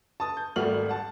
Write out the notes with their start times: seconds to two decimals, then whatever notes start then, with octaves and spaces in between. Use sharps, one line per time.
0.20 A5 D#6
0.37 G6
0.56 G#1 G3 A3 F#4 F6 F#7
0.89 F#5 A5